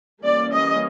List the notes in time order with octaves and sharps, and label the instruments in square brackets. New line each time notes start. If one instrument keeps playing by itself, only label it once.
[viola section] E3 G3 A#3 C#4 D5
D#5